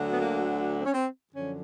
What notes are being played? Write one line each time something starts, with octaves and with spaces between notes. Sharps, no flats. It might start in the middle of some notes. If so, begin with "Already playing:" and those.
Already playing: D2 D3 F#3
B3
A#3
C4
C#4
C4
F#2 D3 F3 C#4